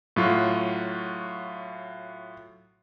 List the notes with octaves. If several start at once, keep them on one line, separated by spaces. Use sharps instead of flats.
A2 F#3 F4 F#4